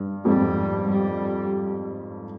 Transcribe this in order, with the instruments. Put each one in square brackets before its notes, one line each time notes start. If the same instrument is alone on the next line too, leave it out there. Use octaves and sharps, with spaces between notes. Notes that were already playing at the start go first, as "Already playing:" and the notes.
Already playing: [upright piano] G2
[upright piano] F2 G#2 [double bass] G3
[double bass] G3